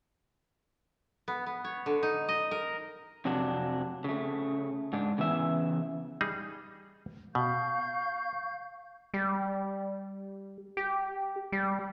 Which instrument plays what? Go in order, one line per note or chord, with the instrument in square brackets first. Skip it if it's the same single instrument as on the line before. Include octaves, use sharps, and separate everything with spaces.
[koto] B3
B3
C#5
D3
D#4
D#5
A#4
[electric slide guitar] F2 C3 F#3 D4
C#3 A3
G#2 D4
C#3 E3 B3 E5
[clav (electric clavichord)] G3 D#4 G#4
[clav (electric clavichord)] B2 [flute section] F5 C#6 G6
[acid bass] G3
G4
G3